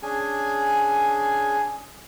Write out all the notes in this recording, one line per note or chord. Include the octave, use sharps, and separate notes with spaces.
C#4 D4 G#4 G#5